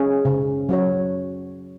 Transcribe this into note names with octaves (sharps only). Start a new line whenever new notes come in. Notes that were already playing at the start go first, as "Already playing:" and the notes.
Already playing: C#4 G#4
C#3
F#3 C#4 F#4 C#5